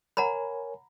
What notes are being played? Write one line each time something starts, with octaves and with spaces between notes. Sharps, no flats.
A#4 C#5 F#5 G#5 A#5 B5